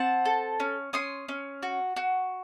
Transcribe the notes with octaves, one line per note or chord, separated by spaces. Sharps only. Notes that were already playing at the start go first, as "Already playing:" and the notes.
Already playing: C4 F#5 A5
A4
C#4
C#4 C6 D#6
C#4
F#4
F#4